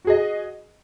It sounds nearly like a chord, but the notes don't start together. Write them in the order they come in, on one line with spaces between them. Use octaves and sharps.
F#4 G#4 D#5